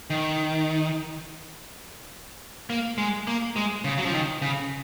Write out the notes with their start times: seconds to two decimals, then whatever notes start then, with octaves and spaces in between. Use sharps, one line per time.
0.10 D#3
2.70 A#3
2.98 G#3
3.27 A#3
3.56 G#3
3.84 C#3
3.98 F#3
4.05 F3
4.13 D#3
4.42 C#3